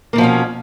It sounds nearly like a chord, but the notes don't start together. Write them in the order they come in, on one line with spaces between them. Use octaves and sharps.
A#3 D#3 F3 B2 C#4